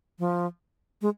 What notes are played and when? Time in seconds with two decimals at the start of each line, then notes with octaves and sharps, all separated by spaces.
0.19 F3
1.02 G#3